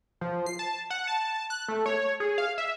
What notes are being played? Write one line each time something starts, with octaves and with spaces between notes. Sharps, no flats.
F3
C7
A5
F#5
A5
F#6
A3
C#5
G#4
F5
E5